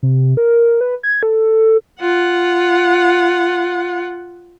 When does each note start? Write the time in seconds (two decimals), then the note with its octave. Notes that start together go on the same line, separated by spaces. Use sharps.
0.03 C3
0.37 A#4
0.81 B4
1.03 G#6
1.23 A4
2.01 F4 F#5